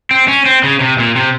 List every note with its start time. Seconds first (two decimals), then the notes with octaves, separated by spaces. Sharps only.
0.11 C4
0.28 C#4
0.46 C4
0.63 C#3
0.81 C3
0.99 A#2
1.16 C3